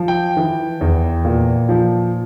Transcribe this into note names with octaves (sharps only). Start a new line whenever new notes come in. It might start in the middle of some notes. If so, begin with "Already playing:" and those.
Already playing: F3
G5
E3
E2
A#2
F3